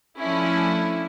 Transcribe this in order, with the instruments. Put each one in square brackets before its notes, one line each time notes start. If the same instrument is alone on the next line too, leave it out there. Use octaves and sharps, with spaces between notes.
[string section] F3 A3 C#4 D4 E4